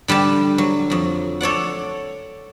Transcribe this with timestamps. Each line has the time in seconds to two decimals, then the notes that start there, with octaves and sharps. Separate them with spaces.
0.08 D3 G3 G5 A5
0.58 F#3
0.90 F2 F#3
1.41 A4 C#5 D5 F#5